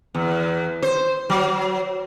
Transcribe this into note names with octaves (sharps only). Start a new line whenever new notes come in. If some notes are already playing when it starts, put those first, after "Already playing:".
E2
C5
F#3